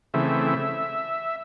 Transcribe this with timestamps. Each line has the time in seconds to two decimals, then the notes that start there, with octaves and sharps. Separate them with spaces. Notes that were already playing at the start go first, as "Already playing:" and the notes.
0.14 C#3 E3 A3 C4 E5